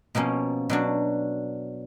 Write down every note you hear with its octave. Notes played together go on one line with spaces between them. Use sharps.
B2 F3 A#3 C#4
B2 F#3 D4